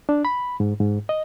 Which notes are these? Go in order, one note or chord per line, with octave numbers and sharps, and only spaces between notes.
D4
B5
G#2
G#2
D#5